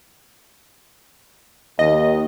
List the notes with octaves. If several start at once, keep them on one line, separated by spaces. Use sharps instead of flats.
D#2 D#5